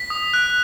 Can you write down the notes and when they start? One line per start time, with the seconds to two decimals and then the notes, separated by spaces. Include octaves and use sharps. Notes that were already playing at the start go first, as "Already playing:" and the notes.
Already playing: B6
0.10 D#6
0.34 F#6